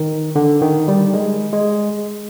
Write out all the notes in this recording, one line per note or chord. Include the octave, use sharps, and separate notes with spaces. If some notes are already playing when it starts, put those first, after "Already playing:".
Already playing: D#3
D3
D#3
G3
G#3
G#3